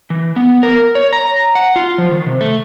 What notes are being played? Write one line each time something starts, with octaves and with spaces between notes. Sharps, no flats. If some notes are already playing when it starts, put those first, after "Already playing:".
E3
B3
A#4
C#5
A#5
F#5
F4
F3
D#3
C3
A3